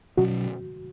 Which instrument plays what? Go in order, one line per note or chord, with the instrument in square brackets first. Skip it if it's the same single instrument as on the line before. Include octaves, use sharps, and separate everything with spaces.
[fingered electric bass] B2 F#3 C#4 [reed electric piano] F#4